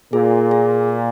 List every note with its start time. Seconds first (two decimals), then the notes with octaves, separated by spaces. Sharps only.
0.13 A#2 G#4
0.51 G#4